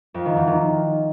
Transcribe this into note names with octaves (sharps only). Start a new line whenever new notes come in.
F2
D#3
E2
D#3